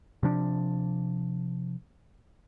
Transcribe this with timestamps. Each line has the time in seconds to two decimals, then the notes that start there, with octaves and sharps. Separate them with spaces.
0.23 C3 F3 D4